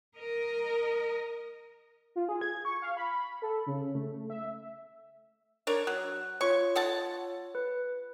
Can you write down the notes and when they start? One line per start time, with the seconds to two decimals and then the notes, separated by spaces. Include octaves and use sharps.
0.18 A#4 D#5
2.16 F4
2.29 G#4
2.41 G#6
2.65 C#6
2.82 F5
2.97 B5
3.42 A4
3.66 C#3
3.95 A3
4.30 E5
5.67 D4 A#4 C#5
5.87 F#3 F#6
6.41 F4 C#5 C#6
6.75 A4 F#5 A5
7.55 B4